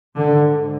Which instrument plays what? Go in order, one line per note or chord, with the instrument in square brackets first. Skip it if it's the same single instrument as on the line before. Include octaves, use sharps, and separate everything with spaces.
[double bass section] G#2 D3